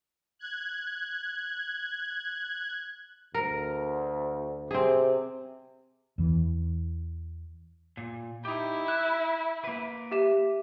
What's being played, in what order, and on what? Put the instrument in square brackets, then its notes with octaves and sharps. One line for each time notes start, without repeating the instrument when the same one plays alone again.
[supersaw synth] F#6 G#6
[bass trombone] D2 [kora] A#4
[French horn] C3 [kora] C4 G#4
[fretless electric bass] E2 E3
[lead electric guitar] A#2
[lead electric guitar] D#4 G4 [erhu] E4
[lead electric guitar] E5 [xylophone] F#6
[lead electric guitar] A#3 B4
[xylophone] G4 E5 E7